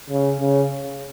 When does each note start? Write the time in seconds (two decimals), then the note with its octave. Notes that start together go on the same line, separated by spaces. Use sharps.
0.10 C#3
0.40 C#3